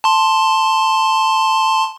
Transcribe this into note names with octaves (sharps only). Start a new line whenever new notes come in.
A5 C6